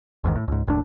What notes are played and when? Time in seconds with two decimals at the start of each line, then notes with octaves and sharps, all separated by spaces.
0.24 A1 E2 G#2 D#3
0.35 A2
0.48 C#2 G#2
0.67 F#1 D#2 A2 D4